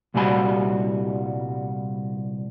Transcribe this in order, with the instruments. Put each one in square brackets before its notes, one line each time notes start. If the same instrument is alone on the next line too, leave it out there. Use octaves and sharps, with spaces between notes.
[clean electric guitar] C2 A#2 G3 F#4 G#5 B5